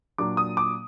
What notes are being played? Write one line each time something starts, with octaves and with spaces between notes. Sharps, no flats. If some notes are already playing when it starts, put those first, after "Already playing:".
A#2 F#3 A#3 D4 D6
D#6
D6